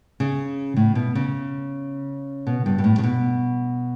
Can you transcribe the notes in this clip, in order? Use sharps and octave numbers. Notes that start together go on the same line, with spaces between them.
C#3
A2
B2
C#3
B2
G2
B2
A2
C#3
B2